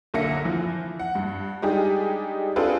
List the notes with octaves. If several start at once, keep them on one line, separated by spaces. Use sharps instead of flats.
B1 D3 A#3 E5 A#6 C#7
E3 F3
F#5
G2
G3 G#3 D4 D#4 G4 G#4
C4 D4 F4 G#4 A4 B4